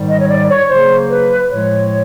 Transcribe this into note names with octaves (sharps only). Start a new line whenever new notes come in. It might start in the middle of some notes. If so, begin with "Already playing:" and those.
Already playing: G#2 D#3 G3
D#5
C#5
D5
C#5
C#3 F#3 A#3 C5
B4
A2 F3 G#3 C#5